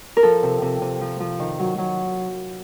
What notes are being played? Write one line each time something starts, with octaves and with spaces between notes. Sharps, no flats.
A#4
F3 A4
C3
C3
C3
F3
F3
D#3
F#3
F#3